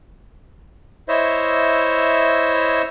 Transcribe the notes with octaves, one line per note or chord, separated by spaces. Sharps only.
E4 C5 C#5 D#5 E5